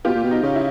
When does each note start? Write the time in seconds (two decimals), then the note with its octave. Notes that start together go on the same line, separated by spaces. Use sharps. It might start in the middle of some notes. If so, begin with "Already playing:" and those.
0.05 B2 F4 G4
0.15 A#2
0.24 B2
0.31 D#4
0.43 C#3
0.56 E4